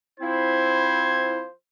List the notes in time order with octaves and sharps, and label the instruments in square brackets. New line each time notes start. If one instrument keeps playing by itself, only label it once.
[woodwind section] F3 C4 E4 [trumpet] C5 [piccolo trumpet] G#6